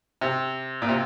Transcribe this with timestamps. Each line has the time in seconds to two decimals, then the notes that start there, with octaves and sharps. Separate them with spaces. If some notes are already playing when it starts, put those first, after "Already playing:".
0.21 C3
0.82 A#2
0.89 C3